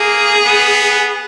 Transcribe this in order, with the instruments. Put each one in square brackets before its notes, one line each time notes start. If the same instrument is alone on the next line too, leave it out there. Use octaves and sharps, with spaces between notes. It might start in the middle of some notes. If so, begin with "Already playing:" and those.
Already playing: [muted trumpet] A#3 [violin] G#4
[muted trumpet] B3